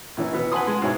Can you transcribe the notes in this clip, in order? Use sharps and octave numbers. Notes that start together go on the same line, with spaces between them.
A#1 E3 C#4
B2 E3 B3
B4 F#5 G#5 A5 C6 D#6
G#3
G#2 B2 E4 C#5 G#5